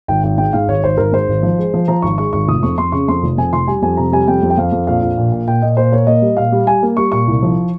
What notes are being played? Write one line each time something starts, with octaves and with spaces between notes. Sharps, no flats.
G#1 G5
G#1 G5
G#2 G5
G#2 F5
G#1 C#5
G#1 C5
G#1 A#4
G#2 C5
G#1
F3
G#3
F3
F3 A#5
G#1 C#6
G#3 C#6
G#1 C#6
F1 D#6
F2 C#6
F2 C6
C#3 C#6
F2 C6
F1
F2 G#5
F1 C6
G3 G#5
F2 G#5
C3 A#5
G3 G#5
F2 G5
F2
G5
F2 F5
F2
A#1 F5
A#1
A#2
A#2
A#2 G5
A#2 D#5
A#2 C5
A#3 C#5
A#3 D#5
G3
A#2 F5
G3
G3 G#5
A#3
G3 C#6
A#2 C#6
C2
F3